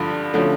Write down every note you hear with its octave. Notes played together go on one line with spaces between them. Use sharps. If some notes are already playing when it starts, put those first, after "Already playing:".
Already playing: G2 D3 F3
D3 F3 A3 C#4